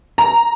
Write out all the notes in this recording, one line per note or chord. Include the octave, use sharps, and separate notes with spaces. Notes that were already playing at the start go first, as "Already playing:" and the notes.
A#5